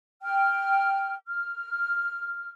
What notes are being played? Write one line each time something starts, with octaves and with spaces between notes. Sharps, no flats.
G5 F6
F6